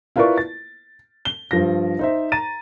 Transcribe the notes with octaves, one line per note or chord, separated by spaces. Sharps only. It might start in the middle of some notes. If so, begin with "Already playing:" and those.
E4 F4 A#4 B4 D5 C#6
A6
G7
G2 F3 A#6
D#4 C5 E5
A#5 A6 D#7